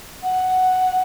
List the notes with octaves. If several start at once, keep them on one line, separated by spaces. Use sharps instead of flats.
F#5